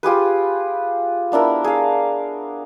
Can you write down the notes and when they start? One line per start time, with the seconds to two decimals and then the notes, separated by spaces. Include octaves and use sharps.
0.03 F4 G4 G#4 B4
1.32 B3 D4 E4 A#4
1.64 G#4 F5